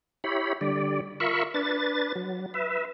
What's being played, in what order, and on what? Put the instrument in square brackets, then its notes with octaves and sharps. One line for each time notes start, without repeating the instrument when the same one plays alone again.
[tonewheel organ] E4 G4 C#5 B5
D3 G3 D5
F4 A#4 E5 B5 C#6
D4 B4 A6
F#3
B4 E5